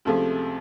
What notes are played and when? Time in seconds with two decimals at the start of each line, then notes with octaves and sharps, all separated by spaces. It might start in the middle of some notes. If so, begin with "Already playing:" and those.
0.05 C#2 C3 F3 A3